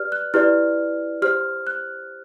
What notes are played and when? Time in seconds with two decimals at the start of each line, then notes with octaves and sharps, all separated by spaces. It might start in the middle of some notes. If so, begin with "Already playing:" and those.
Already playing: G4 B4 D5 F6
0.12 F#6
0.34 E4 G4 B4 D5 F6
1.22 G4 C5 F6
1.67 F#6